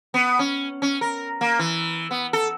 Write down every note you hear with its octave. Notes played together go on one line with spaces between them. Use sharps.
B3
C#4
C#4
A#4
A#3
E3
B3
A4